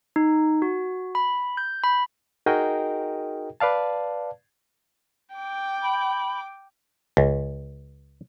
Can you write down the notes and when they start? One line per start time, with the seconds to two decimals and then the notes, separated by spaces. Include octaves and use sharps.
0.16 D#4
0.62 F#4
1.15 B5
1.57 G6
1.84 B5
2.46 D#4 F#4 G#4 A#4 D#5 G5
3.60 B4 D5 F5 A5
5.35 G5 D6
5.82 B5
7.17 C#2